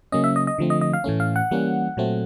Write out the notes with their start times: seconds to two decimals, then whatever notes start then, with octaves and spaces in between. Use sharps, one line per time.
0.12 C#3 F#3 A#3 C#4 D#5
0.24 E5
0.36 D#5
0.47 D#5
0.58 D3 F3 A3 C4
0.70 D#5
0.81 D#5
0.93 F5
1.04 A2 E3 A3 C#4
1.20 F5
1.36 F#5
1.51 E3 G3 A#3 C#4
1.97 A#2 F#3 A3 C4